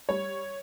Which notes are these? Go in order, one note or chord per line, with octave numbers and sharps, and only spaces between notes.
G3 C#5